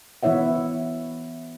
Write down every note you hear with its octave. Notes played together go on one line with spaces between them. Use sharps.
E3 B3 E4 C#5 E5 F#5